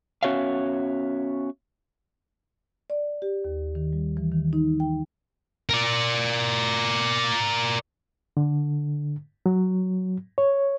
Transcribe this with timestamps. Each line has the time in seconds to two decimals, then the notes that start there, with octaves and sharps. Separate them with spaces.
0.23 B3 C#4 F#4 C#5 E5 F5
2.90 D5
3.22 G4
3.45 D#2
3.75 D#3
3.93 G3
4.17 E3
4.32 D#3
4.53 D#4
4.80 G5
5.69 A#4 D5
8.37 D3
9.46 F#3
10.38 C#5